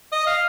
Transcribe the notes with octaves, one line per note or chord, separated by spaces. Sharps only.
D#5
F5